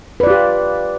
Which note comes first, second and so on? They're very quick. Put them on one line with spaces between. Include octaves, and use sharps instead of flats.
B4 D5 F4 G4